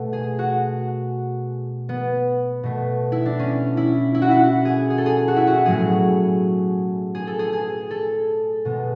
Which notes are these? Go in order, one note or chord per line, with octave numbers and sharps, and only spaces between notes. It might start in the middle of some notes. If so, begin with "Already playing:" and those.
Already playing: B2 A3
G#4
F#4
B3
B2 A3
E4
D4
C#4
E4
E4
F#4
E4
F#4
G#4
G#4
A4
G#4
F#4
E4
F#4
A2 F#3 A3 G#4
G#4
A4
G#4
G#4
A4
B2 G#3